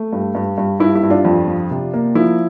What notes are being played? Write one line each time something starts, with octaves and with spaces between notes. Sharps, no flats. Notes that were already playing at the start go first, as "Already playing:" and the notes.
Already playing: A3
G2
G2
G2
G2 E4
E4
G2
D4 F4
F2
F3
C3
A#3
F3 E4